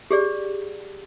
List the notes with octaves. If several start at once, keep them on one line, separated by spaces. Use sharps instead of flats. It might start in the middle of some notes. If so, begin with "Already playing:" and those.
G4 G#4 D5